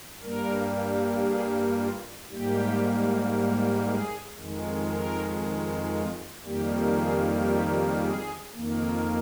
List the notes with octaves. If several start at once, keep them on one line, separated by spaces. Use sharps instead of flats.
G2 G3 A#3 A#4
G#4
F4
G#2 G3 A#3 G4
G#4
F2 D#3 G#3
A#4
F4
F2 D#3 G3 A#3 G4
G#4
G4
G#4
F2 D#3 A#3